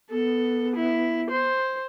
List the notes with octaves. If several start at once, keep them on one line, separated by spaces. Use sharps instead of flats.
B3 A4
E4
C5